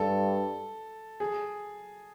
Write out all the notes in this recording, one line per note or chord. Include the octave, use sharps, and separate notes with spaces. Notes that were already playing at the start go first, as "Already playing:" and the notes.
Already playing: G2 A4
G#4